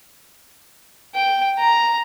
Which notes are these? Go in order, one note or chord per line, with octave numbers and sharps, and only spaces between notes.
G5
A#5